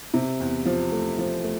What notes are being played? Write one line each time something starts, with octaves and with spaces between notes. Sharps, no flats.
C3
E2
F3
A3
F3
A3